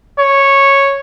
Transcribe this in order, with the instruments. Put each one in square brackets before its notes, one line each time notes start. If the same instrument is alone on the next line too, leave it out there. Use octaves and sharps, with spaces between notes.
[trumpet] C#5